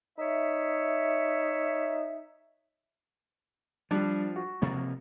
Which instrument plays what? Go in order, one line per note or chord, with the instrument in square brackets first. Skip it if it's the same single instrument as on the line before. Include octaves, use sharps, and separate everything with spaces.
[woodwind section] D#4 C#5 E5
[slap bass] F3 [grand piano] G3 D4
[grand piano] F#4
[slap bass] C3 F3 A#3